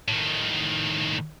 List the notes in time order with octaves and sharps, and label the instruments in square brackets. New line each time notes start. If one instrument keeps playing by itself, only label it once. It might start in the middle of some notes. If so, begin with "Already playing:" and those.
[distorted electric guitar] A2 D#3